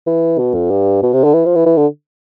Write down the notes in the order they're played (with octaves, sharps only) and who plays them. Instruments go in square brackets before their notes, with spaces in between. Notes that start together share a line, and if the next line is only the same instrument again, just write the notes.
[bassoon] E3
B2
F2
G2
B2
C3
D3
E3
F3
E3
E3
D3